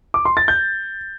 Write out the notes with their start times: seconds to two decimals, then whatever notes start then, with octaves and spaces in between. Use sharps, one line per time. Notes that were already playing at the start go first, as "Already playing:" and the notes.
0.14 D6
0.25 C6
0.37 A6
0.48 G6